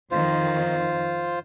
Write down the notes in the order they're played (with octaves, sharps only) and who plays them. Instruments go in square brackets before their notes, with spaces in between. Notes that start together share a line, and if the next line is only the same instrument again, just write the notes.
[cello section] F2 D#3 [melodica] F4 C5